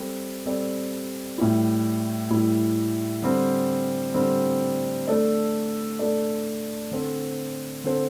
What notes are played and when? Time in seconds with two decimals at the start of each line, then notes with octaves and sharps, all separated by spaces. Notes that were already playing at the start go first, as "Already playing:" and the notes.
Already playing: G3 C4 A4
0.46 G3 C4 A4 D5
1.38 A2 G3 E4
2.30 A2 G3 E4
3.22 D3 G3 C4
4.14 D3 G3 C4
5.07 A3 D4 A4 D5
5.99 A3 D4 A4 D5
6.92 D3 C4 A4 C5
7.84 D3 C4 A4 C5